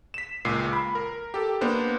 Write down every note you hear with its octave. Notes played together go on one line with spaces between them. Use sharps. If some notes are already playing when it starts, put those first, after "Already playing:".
B6 E7
C#2 A#2 C7
B5
A#4
G4 A4
A#3 B3 D4 C5